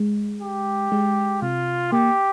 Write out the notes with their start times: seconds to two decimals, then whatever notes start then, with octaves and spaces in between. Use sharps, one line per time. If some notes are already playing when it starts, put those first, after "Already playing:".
Already playing: G#3
0.42 G4
0.92 G#3
1.42 C3 F4
1.92 A#3 G4